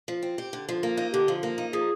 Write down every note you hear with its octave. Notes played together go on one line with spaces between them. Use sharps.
F3
C4
G4
D3
F3
A#3
D#4
D3 G4
F3
A#3
D#4
F3 G#4